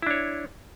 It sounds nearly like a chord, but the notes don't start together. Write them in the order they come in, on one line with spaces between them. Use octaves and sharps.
E4 D4 C#5